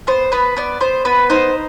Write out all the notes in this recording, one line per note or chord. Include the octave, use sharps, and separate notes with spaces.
B3 C5
B3 B4
B3 D5
B3 C5
B3 B4
D#4 C5